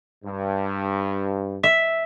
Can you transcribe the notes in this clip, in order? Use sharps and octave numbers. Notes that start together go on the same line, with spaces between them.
G2
E5